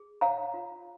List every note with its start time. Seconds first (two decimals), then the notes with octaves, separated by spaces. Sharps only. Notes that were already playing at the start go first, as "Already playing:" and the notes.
Already playing: G#4
0.21 C#5 F5 A#5
0.54 F4